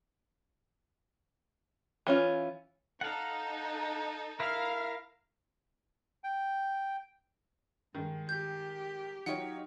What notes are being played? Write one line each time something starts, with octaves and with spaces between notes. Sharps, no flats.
E3 C#4 F4
D#4 A4 F5 F#5
E4 A#4 E5 F5
G5
G2 D#3 G#3
G4 G6
F#3 D#4 F4 C#5 F#5 G5